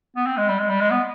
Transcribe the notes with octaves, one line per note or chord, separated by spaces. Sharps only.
B3
C4
G#3
G3
G#3
G3
G#3
B3